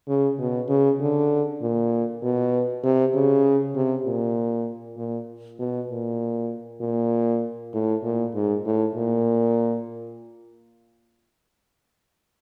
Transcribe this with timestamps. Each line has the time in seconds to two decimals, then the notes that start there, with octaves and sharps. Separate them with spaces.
0.08 C#3
0.39 B2
0.69 C#3
1.01 D3
1.62 A#2
2.23 B2
2.84 C3
3.14 C#3
3.75 C3
4.06 A#2
4.97 A#2
5.59 B2
5.90 A#2
6.81 A#2
7.74 A2
8.04 A#2
8.34 G#2
8.65 A2
8.96 A#2